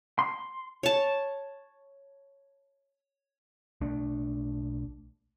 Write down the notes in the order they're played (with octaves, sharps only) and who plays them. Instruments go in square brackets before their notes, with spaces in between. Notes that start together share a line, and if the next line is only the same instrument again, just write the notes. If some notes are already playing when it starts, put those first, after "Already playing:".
[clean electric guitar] C6
[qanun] C#5 A5
[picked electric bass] B1 A3 D4